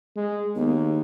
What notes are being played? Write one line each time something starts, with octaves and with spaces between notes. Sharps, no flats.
G#3
D#2 B3